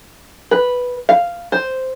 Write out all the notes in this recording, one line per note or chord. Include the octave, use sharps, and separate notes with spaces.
B4
F5
C5